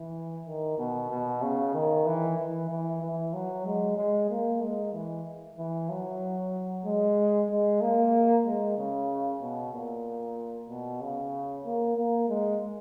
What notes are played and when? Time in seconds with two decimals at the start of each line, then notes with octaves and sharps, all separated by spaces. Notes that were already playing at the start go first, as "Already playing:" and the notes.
Already playing: E3
0.46 D#3
0.78 B2
1.10 B2
1.42 C#3
1.74 D#3
2.06 E3
2.39 E3
2.70 E3
3.03 E3
3.34 F#3
3.66 G#3
3.97 G#3
4.30 A#3
4.61 G#3
4.94 E3
5.58 E3
5.90 F#3
6.85 G#3
7.50 G#3
7.81 A#3
8.45 G#3
8.78 C#3
9.42 B2
9.73 A#2
10.69 B2
11.01 C#3
11.65 A#3
11.97 A#3
12.29 G#3